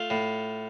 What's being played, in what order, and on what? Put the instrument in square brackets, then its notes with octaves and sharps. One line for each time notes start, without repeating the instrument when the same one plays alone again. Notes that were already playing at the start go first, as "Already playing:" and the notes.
Already playing: [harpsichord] A3 F4
A2